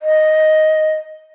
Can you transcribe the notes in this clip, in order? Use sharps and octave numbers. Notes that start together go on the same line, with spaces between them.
D#5